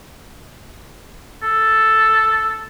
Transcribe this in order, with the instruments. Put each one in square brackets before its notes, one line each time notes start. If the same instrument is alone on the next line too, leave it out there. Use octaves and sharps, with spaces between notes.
[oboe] A4